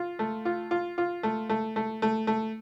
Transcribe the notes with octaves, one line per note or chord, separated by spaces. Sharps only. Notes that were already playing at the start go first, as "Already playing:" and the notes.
Already playing: F4
A3
F4
F4
F4
A3
A3
A3
A3
A3